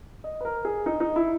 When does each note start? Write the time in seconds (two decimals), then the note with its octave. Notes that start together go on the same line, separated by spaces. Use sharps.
0.24 D#5
0.41 B4
0.45 A#4
0.65 G#4
0.86 D#4
1.00 D#4
1.16 E4